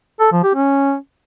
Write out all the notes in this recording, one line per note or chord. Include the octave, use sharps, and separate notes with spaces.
A4
F3
G4
C#4